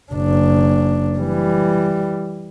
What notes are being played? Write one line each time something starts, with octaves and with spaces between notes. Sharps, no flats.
F#1 D4
E3 G3